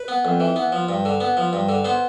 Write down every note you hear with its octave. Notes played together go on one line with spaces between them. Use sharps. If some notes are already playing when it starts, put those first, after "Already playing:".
Already playing: B4
B3
F2
E3
B3
F3
G2
D3
B3
F3
G2
D3
B3 C5